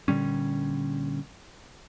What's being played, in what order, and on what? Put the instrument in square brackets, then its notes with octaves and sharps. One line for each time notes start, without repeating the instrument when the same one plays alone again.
[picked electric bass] A#2 D3 G3 C#4